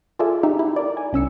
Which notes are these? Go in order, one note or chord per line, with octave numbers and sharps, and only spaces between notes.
F4 G#4 A4 D5 E5
D#4 G4 E5
E4
A#4 D5
G#5
C2 C#4 E6 C#7